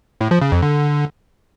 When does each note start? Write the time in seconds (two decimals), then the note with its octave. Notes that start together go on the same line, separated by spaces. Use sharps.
0.21 A2
0.31 F3
0.42 C#3
0.52 F2
0.62 D3